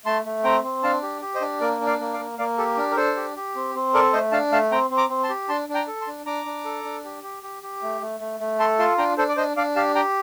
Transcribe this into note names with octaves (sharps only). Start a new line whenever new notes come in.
A3 A5 C6
A3
C4 G5 A#5
C4
D4 F5 A5
G4
G4
C5 D#5
D4
A#3 A#4 D5
D4
D5 F5
A#3
D5 F5
A#3
A#3 D5 F5
G4 A4
D4 A#4
A#4
D4 A4 C5
G4
G4
C4
C4
A4 A#4 D5
A3 C5 D#5
D4 F5 A5
A3 F5 A5
C4 G5 A#5
C4
A#5 D6
C4
A5 C6
G4
D4 A5 C6
D4
G5 A#5
A4
A5 C6
D4
D4 A#5 D6
D4
A4
D4
G4
G4
G4
G4
A3
A3
A3
A3
A4 A5 C6
F4 A5 C6
D4 G5 A#5
D4 A4 C5
D5
D4 C5 D#5
D4 D5 F5
G4 F5 A5
G4 G5 A#5